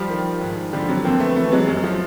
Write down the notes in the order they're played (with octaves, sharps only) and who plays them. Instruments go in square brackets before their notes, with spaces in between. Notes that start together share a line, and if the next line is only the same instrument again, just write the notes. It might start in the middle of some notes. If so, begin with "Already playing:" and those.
Already playing: [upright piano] F3 G3
D#3
G#2
D3 F3 G3
F#3
F2 A#3 C4
A3 B3
E3 A3 B3
F#3 G#3
F#2 F#3
F3